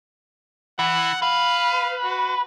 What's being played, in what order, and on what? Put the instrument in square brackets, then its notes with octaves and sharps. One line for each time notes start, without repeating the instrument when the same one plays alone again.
[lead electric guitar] E3 [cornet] F#5
[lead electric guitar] B4 [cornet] F5
[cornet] F#4